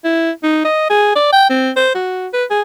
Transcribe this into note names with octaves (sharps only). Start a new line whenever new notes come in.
E4
D#4
D#5
G#4
D5
G5
C4
C5
F#4
B4
G#4